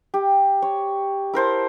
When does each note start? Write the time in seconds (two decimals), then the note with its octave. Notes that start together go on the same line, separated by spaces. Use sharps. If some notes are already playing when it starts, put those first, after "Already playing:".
0.14 G4
0.62 C#5
1.34 E4 A#4 C5 A5